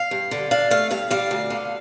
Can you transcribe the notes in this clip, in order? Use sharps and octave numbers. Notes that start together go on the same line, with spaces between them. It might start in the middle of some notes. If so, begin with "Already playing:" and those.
Already playing: F5
G2
D3
D4 F5
A3 F5
G2 F5
G3 F5
D2
D3